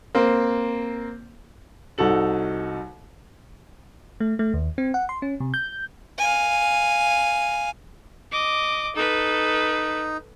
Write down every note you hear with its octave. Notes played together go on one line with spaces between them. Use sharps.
A#3 C4
C2 D#4 F#4 A4 F#7
A3
A3
D#2
C4
F#5
C6
C#4
C3
G6
F5 G#5
D#5 D6
D#4 A4 B4